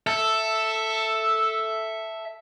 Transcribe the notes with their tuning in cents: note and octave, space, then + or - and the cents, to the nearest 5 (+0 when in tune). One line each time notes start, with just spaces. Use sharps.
A4 +5 E5 +0